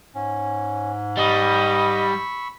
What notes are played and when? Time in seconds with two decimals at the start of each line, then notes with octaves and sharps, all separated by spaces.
0.15 G#2 C#4
1.17 G3 D#5 B5 C#6 E6